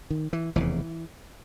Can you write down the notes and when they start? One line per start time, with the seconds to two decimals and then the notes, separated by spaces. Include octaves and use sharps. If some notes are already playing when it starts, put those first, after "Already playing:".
0.10 D#3
0.33 E3
0.56 F1 E2 C#3 E3